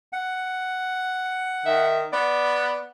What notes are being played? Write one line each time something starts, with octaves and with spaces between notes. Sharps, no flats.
F#5
D#3 E5
B3 D5